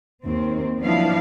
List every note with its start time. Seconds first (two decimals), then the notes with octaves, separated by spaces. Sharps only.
0.23 D#2 C4
0.82 F3 F#3 B3 D4 E4 F5